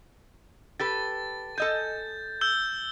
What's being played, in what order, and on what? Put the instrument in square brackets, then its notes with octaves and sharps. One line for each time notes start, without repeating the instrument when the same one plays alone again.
[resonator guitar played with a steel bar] G4 A4 B4 [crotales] A6
[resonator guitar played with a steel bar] A4 D#5 G#5 [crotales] G6
[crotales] E6 G6 G7